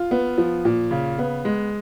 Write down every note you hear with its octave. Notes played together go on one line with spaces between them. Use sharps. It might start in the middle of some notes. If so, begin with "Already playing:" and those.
Already playing: F4
B3
F3
A#2
C#3
B3
G#3